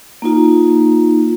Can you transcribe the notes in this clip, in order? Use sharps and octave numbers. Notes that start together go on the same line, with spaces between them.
A#3 D#4 F4